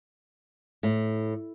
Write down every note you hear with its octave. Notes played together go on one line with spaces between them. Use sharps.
A2